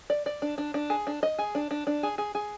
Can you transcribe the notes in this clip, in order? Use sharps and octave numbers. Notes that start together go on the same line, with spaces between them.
D5
D5
D4
D4
D4
G#4
D4
D#5
G#4
D4
D4
D4
G#4
G#4
G#4